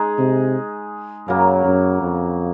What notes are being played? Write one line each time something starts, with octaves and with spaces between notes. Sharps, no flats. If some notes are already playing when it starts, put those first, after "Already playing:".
Already playing: G#3 D#4 G#4
C3
F#2 C#3 F#3 A#3
F#2
F2